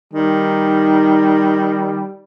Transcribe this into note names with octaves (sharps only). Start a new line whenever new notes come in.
D#3 G3 D#4